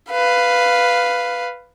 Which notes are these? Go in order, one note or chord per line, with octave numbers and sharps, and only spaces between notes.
B4 F5